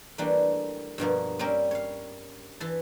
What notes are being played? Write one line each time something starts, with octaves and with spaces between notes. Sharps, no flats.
E3 G3 A3 A#3 D4
G2 B2 F3 A#3
G3 A#3 C4 C#4 A#4
C#5 F5
E3 E5 A5